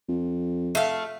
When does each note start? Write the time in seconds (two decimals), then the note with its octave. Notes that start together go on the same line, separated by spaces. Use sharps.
0.09 F2
0.75 A3 F5